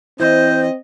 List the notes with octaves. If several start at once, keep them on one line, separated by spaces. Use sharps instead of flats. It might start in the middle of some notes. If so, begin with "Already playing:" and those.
E3 C4 E4 C5 D#5